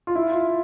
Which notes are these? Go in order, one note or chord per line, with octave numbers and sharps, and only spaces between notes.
F4
E4
F4